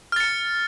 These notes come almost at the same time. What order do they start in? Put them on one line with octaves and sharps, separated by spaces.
F6 A6 C#7